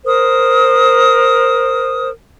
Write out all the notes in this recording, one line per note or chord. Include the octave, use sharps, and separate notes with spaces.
A#4 C5 D#6